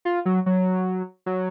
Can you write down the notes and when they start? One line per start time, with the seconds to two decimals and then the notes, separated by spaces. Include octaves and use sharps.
0.05 F4
0.26 F#3
0.46 F#3
1.26 F#3